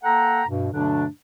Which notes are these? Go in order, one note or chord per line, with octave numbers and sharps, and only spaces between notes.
A#3 A4 F#5 G5 A#5
G2 B2
G2 B2 D3 F#3 A3 D4